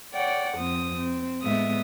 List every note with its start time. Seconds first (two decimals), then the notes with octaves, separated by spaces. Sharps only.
0.13 C#5 D5 F#5 G5
0.54 F2 C4 D#6
0.96 C4
1.42 A2 G#3 A3 B3 E5 D#6